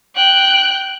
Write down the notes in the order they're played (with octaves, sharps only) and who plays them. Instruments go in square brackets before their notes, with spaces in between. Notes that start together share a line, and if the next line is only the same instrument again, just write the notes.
[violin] G5 F#6